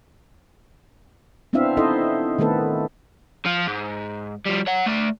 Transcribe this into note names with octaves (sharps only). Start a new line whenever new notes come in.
B3 C4 D4 E4 E5 F5
D#4 E4 A4 C5 D#5
D#3 A3 B3 A4 B4
F3 F4
G#2
F3 G3
C#5 F#5
A3 D5